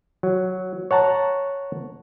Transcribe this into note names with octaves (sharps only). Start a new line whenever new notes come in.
F#3
C#5 F#5 A5 A#5